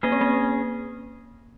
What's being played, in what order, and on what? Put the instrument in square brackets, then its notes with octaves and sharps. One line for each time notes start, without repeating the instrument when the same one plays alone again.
[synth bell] A#3 [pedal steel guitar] C#4 G#4 D#5
[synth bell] C4
A#3